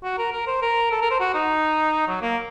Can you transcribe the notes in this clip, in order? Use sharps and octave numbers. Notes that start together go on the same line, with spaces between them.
F#4
A#4
A#4
C5
A#4
A4
A#4
C5
F#4
D#4
F#3
A#3